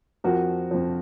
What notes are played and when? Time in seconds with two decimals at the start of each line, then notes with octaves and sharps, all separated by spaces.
0.24 F2 F3 F#4 A#4
0.71 F2 F3